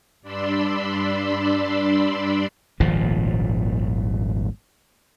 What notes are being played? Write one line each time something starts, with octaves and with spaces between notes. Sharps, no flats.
G2 D4 D5 B5 C6 E6
D#1 G#1 A#2 F3